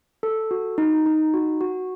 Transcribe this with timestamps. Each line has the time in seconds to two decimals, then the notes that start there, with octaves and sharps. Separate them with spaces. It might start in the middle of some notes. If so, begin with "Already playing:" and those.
0.23 A4
0.51 F#4
0.78 D#4
1.06 D#4
1.34 F#4
1.61 F#4